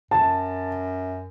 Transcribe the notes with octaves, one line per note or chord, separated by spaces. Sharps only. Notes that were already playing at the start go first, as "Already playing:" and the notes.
F#2 A5